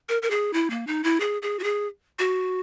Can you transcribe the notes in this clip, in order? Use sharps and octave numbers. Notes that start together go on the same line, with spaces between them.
A#4
A#4
G#4
E4
A#3
D#4
E4
G#4
G#4
F#4
G#4
F#4